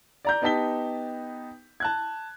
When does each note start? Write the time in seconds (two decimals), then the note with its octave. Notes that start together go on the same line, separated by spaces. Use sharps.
0.25 D5 A#5 G6
0.42 B3 D#4 G4 A5 B6 G7
1.80 A5 F#6 G#6